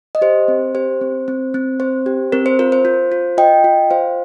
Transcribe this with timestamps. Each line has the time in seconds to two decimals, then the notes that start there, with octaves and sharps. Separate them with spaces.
0.15 D#5
0.22 G4 C5
0.48 C4
0.75 G4 C5
1.01 C4
1.28 C4
1.54 C4
1.80 C4 C5
2.06 G4
2.32 C4 A#4
2.46 C5
2.59 F4 A#4
2.72 C5
2.85 F4
3.12 F4
3.38 F4 D#5 G5
3.64 F4
3.91 F4 C5 F5